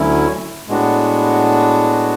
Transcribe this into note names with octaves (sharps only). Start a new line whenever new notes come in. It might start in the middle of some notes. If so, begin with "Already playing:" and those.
Already playing: D2 D3 F#3 C#4 E4
A2 G#3 B3 D4 F#4